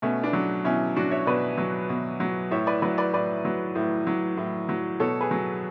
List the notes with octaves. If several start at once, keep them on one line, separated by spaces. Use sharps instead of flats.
B2 A3 C#4
B3 D4
F#3
B2 C#4 E4
F#3 D4 F#4
C#5 E5
B2 B4 D5
F#3
B2
F#3
A2 C#5 E5
B4 D5
F#3 B4 D5
B4 D5
A2 B4 D5
F#3
A2
F#3
A2
F#3
B2 A4 C#5
G#4 B4
F#3